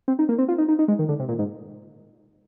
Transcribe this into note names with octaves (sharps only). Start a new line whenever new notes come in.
C4
D#4
A#3
C4
F4
D#4
D#4
D#4
G#3
D#3
D3
C3
A#2
G#2